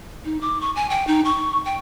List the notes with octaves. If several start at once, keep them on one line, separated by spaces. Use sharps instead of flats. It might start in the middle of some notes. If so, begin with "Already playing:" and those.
D#4
D6
C#6
G#5
G5
D#4
C#6
G5